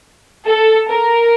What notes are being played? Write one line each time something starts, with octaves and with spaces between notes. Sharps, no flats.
A4
A#4